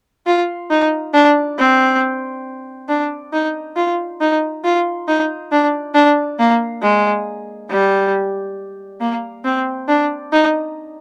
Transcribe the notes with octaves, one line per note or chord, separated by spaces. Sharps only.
F4
D#4
D4
C4
D4
D#4
F4
D#4
F4
D#4
D4
D4
A#3
G#3
G3
A#3
C4
D4
D#4